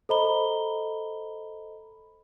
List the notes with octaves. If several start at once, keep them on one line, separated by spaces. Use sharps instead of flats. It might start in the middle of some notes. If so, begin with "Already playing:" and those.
A4 C5 D#5 A#5 B5 G7